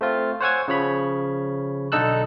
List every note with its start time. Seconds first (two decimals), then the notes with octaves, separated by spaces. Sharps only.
0.01 A3 C4 F4
0.40 C5 C#5 F#5 G#5 E6 G#6
0.68 C#3 F3 C#5 B5
1.92 B1 D3 D#4 A4 E6 F#6